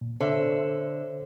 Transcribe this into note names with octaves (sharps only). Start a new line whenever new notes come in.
A#2
D3 A4 C5 C#5 E5